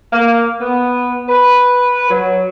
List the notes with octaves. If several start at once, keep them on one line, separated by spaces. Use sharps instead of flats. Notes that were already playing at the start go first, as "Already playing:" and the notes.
A#3
B3
B4
F#3